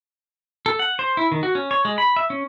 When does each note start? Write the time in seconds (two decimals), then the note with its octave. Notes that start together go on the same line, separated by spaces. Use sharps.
0.66 A4
0.79 F#5
0.99 C5
1.17 E4
1.32 D#3
1.43 F#4
1.55 C#4
1.71 C#5
1.85 G#3
1.98 B5
2.16 E5
2.30 C#4